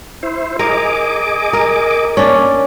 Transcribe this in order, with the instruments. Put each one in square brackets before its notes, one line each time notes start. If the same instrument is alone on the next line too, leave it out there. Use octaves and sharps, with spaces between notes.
[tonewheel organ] E4 C5
[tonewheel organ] G#4 D#5 D6 [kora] A#4
[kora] A#4
[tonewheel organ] A#3 [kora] C#4 D4